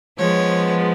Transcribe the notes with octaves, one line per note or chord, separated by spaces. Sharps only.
F3 G#3 B3 C#5